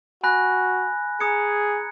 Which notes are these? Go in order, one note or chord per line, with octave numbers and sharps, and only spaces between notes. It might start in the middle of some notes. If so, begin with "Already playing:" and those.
F#4 G#5 B5 F#6 A#6
G#4 A#5 D#6 G#6 C#7